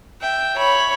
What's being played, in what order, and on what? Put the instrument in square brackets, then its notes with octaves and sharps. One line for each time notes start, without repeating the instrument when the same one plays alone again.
[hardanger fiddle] E5 G5
[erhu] C#5 [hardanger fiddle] B5